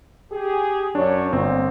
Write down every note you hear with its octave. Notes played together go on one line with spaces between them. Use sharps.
G4 G#4
F#2 D4 C#5
G1 A#2 C4